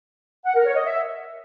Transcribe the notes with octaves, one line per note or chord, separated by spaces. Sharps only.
F#5
A#4
C#5
D#5
E5